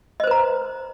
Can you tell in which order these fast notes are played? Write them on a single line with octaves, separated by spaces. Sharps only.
D#5 C5 B4 A#5